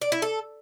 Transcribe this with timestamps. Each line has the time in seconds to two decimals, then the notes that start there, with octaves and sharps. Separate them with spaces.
0.02 D5
0.12 E4
0.22 A4